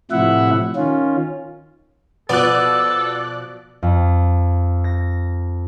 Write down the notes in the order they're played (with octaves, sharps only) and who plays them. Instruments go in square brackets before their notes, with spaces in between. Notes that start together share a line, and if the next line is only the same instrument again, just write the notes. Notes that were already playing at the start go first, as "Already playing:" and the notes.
[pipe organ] A2 C3 F3 E4 E5 F#5
D#3 C#4 F4
[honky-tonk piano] B2 F3 [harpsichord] B3 [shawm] A4 [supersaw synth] D5 F#6
[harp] F2
A#6